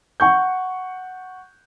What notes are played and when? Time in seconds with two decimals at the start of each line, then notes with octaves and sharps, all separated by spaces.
0.20 F#5 C#6 G6